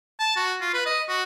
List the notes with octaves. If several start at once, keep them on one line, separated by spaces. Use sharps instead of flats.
A5
F#4
F4
B4
D#5
F#4